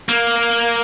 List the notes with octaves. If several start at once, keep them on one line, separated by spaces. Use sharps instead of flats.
A#3